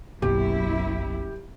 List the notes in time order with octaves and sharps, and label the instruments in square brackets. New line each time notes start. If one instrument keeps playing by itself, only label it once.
[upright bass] F#1 [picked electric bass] B1 B2 [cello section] F#2 E4 [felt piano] G4